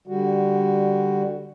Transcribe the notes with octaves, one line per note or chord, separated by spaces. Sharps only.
D3 G3 F#4